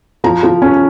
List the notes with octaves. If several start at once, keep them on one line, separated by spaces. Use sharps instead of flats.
F3 A#5
F3
C#4